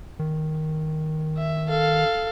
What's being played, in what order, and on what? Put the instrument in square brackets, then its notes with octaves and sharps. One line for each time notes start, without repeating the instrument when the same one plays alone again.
[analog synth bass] D#3
[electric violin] E5
A4 F5